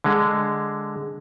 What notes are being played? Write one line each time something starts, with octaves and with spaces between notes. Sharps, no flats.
D3 G#3